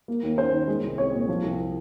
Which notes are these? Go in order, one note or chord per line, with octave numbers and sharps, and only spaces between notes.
A#3
D#2
C#4 C5
D#3
G#3
C2
C4 C#5
A#2
F3
C2